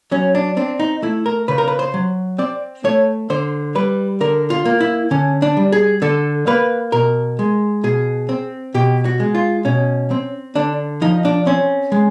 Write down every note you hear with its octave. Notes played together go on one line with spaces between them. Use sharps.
F#3 C#4
D4
C4 D4
D#4
A3 E4
A#4
C#3 B4
A#4
B4
C5
F#3
C4 D5
A3 C#5
D3 C5
G3 B4
D3 A#4
F4
A#3
E4
D3 C#4
D4
G3
G#4
D3 A4
A#3 B4
B2 A#4
G#3
B2 G#4
C4
B2 G4
F#4
G#3
F4
B2 C#4
C4
D3 D4
F3 D#4
D4
C4 C#4
G#3